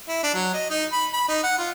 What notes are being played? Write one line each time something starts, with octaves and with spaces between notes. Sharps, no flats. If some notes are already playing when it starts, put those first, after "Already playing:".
E4
D4
F#3
D#5
D#4
B5
B5
D#4
F#5
F4